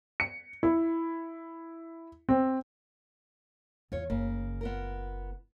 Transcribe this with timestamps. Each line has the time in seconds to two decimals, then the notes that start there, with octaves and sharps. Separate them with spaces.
0.20 C#7
0.63 E4
2.29 C4
3.92 E2 E3 F4 C#5
4.10 F#1 C#3 A#3
4.61 B3 F4 A#4